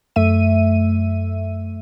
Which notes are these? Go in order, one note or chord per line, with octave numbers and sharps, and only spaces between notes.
F#2 A3 E5 D#7